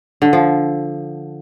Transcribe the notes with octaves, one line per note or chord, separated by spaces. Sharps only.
D3
F3